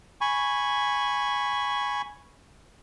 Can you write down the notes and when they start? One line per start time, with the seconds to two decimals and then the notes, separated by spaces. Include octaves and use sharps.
0.21 G#5 B5 C#6